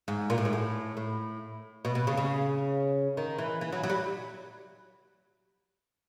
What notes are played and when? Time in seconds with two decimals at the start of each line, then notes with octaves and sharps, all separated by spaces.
0.08 G#2
0.30 A#2
0.38 A2
0.45 G#2
0.53 A2
0.97 A2
1.85 B2
1.95 B2
2.07 C#3
2.17 C#3
3.17 D#3
3.39 E3
3.61 E3
3.72 F#3
3.83 F#3
3.90 G3